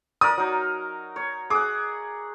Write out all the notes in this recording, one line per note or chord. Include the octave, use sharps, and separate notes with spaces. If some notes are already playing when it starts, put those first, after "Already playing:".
A#4 D5 D#6
F#3 D#4
C#5
G#4 F#5 D6